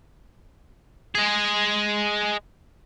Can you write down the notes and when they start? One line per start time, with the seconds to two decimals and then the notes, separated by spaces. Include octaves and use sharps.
1.15 G#3 G#4